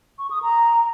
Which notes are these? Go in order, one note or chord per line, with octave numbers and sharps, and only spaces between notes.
C#6
D#6
A#5